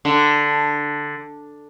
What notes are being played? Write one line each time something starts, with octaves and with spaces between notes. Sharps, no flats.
D3